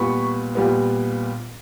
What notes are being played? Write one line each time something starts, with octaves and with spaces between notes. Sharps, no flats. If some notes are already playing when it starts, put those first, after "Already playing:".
Already playing: A#2 G3 B3 B5 C#6
A#2 G3 B3